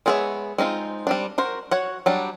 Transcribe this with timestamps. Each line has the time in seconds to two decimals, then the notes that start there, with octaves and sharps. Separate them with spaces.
0.06 G#3 B3 G#4 C#5 E5
0.58 G#3 C4 D#4 F4
1.07 G3 C4 D4
1.38 F#4 A#4 C5
1.71 F#4 C#5 F#5
2.06 F#3 G3 D4